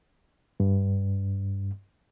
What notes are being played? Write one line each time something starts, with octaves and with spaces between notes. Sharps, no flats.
G2